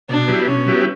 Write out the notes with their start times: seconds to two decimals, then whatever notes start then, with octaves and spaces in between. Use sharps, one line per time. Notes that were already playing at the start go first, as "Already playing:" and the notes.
0.09 B2 D4
0.28 F#3 B3 E4 G4
0.47 B2 C#4
0.67 F#3 B3 E4 G4